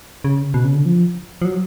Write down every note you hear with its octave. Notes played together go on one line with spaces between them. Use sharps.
C#3
B2
C#3
D3
F3
F3
F#3